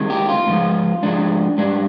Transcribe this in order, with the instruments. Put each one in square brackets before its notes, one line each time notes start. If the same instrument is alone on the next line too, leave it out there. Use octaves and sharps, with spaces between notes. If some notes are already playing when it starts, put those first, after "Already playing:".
Already playing: [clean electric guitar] C2 C3 D#3 G#3
G4
F4
G#2 F3 G#3
G#2 F3 G#3 D4
G#2 G3 D4